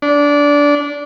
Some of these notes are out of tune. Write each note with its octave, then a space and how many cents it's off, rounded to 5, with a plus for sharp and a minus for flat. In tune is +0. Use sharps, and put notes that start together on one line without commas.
D4 -20